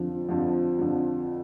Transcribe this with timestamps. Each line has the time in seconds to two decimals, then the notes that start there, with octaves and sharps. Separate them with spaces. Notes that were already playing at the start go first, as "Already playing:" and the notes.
Already playing: F2 D3 F3
0.29 F2 D3 F3
0.79 F2 D3 F3